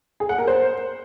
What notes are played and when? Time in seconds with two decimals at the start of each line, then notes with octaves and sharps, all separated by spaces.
0.20 G#4
0.29 F#5
0.38 A#4
0.47 C5